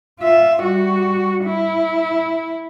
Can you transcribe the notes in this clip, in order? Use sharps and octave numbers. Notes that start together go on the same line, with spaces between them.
F4 E5
G3 F#4
E4